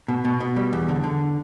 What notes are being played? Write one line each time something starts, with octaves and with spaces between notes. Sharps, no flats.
B2
B2
B2
G3
E2
D3
D3